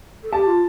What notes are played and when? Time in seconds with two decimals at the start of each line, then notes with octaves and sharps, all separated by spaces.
0.23 A4
0.32 G4 A5
0.47 F4